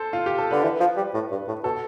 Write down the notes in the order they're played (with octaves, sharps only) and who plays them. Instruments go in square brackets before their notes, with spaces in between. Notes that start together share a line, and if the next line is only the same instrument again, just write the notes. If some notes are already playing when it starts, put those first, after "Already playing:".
Already playing: [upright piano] A4 C5
F4
G4
A4
[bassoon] D3 [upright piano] B4
[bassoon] E3
F3
G3
A2
G2
A2
[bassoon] B2 [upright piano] A4